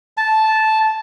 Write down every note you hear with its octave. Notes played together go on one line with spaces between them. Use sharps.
A5